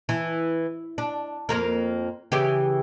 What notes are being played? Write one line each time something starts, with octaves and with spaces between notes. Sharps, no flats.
E3
D4
F2 A#3 A#4
C#3 E3 G4